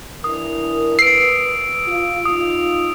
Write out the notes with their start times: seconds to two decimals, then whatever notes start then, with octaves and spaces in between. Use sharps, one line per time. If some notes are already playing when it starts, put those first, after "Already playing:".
0.24 E3 D4 A#4 D#6
0.99 B4 E6 C7 D7
1.87 F4
2.26 D#4 F4 D#6